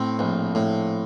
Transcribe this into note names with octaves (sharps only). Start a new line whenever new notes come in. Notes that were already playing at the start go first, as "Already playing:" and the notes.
Already playing: A2 C4
A#1
A2